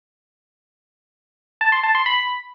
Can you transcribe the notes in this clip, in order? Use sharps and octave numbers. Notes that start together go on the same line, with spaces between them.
A5
C6
A5
C6
B5